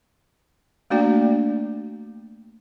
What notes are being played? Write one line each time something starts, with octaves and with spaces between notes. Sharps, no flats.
A3 A#3 D4 F#4 D5 G5